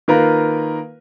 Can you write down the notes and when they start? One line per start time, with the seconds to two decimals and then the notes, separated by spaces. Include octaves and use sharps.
0.08 D#3 A#3 F4 A#4 B4